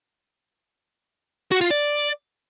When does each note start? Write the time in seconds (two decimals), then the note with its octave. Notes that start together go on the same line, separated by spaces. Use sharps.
1.51 F#4
1.61 F4
1.70 D5